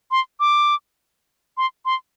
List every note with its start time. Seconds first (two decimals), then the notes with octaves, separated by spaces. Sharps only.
0.11 C6
0.40 D6
1.57 C6
1.85 C6